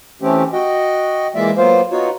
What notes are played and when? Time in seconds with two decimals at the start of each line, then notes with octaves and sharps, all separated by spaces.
0.22 E3 A3 C4 C#4 G4
0.53 F#4 D#5 G5
1.35 E3 G#3 A#3 F4 D5 E5
1.57 F#3 A#3 B3 F4 C5 F5
1.91 B3 D#4 F4 F#4 C#5